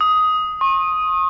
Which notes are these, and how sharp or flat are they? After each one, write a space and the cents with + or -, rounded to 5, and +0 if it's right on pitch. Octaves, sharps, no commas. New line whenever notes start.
D#6 +10
C#6 -45